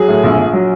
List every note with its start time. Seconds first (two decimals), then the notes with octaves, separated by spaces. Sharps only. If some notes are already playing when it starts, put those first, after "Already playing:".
Already playing: F#3 G#4
0.08 A2
0.24 A#1
0.38 A#1
0.53 F#3